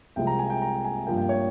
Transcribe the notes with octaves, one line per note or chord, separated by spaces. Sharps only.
C2 C3 F3 G#3 C4 G5
A#5
G#5
G5
A#5
G#5
G2 F3 A#3 G5
G5
C#5